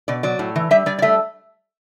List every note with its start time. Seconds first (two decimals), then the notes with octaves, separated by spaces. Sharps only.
0.08 B2 D5
0.23 F#3 D5
0.39 A2
0.56 E3
0.71 G3 E5
0.86 G3 D5
0.99 D5
1.02 A3 E5